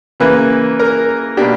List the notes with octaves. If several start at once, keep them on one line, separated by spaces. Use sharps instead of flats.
C#3 E3 A#3 B4
A#4
B2 A#3 D4 G4